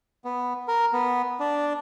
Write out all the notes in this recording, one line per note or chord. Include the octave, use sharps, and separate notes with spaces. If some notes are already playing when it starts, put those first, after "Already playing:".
B3
A#4
B3
D4